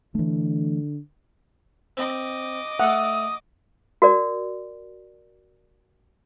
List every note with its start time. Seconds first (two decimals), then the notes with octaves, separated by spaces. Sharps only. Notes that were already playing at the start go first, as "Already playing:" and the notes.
0.15 D3 E3 A3
1.97 C4 D#5 D6
2.80 A3 A4 F#5 D#6
4.02 F#4 A#4 D5